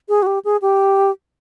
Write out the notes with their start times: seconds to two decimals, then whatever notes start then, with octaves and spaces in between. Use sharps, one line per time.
0.09 G#4
0.22 F#4
0.27 G4
0.45 G#4
0.62 G4